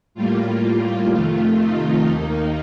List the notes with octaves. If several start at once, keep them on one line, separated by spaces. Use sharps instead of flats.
A2 G3 A#3 F4
F2 C3 D#3 A3
D#4
D#2 D#3 A#3